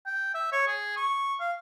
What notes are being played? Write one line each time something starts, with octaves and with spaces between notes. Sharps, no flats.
G5
E5
C#5
G#4
C#6
F5